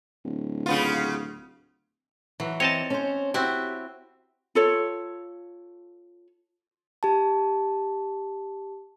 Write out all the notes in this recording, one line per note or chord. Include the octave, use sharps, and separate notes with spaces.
D1
C#3 B3 F4
E3 F#3
C4 C#5 D#5 A5
C#4 C5
C4 E4 F#4 G4
F4 A4 C#5
G4 A5